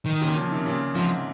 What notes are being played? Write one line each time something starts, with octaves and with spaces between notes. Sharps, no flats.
D#3
A#2 C#3
C#3 F3
C3 D#3
A#2 C#3
G#2 C3 F3